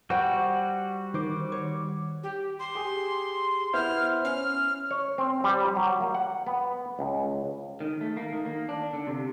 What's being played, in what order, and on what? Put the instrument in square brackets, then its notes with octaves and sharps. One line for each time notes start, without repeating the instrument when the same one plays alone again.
[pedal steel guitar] G3 F#4 [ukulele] C5 F#5 G5
[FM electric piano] D#3 D6 [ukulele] C5
[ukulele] C#5
[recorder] G4
C6
[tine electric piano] G4 G#4
[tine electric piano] B3 E4 C5 [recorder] F6
[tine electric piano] C#4 [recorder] F6
[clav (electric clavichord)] C#5
C4
G3
F#3
A#3
F#5
B3
C#2
[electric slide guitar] D#3
A3
A#3
D#3
A#3
D4
D3
C3